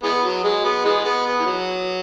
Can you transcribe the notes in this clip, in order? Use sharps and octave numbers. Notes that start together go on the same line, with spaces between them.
E3 G#3 B3
F#3
G#3
B3
E3 G#3
B3
B3
E3
F#3